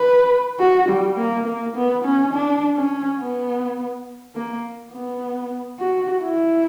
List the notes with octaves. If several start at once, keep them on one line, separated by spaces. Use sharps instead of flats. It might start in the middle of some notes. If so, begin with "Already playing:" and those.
Already playing: B4
F#4
G3
A#3
A#3
B3
C#4
D4
C#4
B3
A#3
B3
F#4
E4